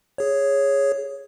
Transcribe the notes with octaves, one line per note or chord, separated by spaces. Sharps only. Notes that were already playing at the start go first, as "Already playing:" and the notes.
G#4 C#5